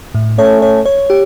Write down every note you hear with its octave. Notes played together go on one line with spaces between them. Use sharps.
A2
A3 C#4 C#5
C#5
C#5
G4